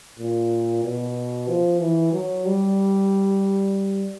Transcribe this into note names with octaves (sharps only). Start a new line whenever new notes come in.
A#2
B2
F3
E3
F#3
G3